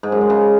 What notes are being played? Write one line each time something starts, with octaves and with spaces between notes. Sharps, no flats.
G#2
F#2
G#3
C#3